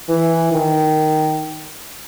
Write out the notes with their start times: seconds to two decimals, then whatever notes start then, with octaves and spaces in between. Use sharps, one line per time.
0.09 E3
0.52 D#3